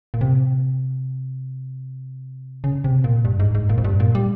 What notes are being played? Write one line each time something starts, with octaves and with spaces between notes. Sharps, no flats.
A#2
C3
C#3
C3
A#2
G2
G#2
G#2
A#2
F2
G2
A#2
G3